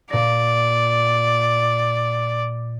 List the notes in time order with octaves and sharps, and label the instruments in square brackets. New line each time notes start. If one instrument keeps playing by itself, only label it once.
[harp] A#2 A#6 [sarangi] D5